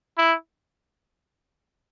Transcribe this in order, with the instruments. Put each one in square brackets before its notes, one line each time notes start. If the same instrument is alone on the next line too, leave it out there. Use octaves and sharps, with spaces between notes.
[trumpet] E4